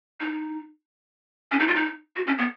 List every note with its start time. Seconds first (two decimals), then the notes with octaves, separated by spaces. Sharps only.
0.20 D#4
1.52 C#4
1.59 D#4
1.68 F4
1.75 D#4
2.16 F#4
2.27 C#4
2.38 B3